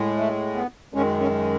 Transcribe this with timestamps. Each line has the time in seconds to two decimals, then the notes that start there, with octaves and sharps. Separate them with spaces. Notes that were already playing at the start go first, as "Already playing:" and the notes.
Already playing: A2 G#3
0.17 A3
0.55 B3
0.94 F#2 D#3 G#3 C#4
1.20 C#4